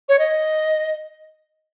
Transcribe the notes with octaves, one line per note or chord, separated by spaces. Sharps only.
C#5
D#5